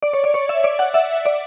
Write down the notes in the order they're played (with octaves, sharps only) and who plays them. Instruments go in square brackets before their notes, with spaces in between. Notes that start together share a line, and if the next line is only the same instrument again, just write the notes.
[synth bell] D5
C#5
D5
C#5
E5
D5
F#5
E5
D5